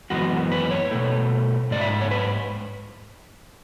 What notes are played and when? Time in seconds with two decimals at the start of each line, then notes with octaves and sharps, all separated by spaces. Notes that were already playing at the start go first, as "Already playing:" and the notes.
0.10 F#2 E3 G#3 B3 F#4
0.52 B4
0.71 C#5
0.91 B2 A3
1.71 G#2 G#3 D5
1.81 E5
2.01 C#5
2.11 B4